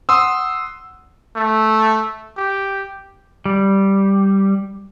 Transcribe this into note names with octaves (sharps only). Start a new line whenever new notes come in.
F#5 C6 D#6 E6
A3
G4
G3